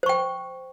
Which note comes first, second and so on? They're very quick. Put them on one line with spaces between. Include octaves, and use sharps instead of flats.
C5 C#6 G5